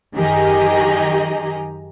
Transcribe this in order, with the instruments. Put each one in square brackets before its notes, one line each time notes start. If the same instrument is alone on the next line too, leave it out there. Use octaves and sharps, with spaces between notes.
[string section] F#2 D#3 G4 G#4 D#5 A#5